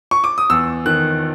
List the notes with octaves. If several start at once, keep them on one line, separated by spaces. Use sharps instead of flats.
C#6
D6
D#6
E2 E6
D#3 F#6